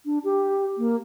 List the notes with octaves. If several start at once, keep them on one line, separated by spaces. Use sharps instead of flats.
D4
G4
A#3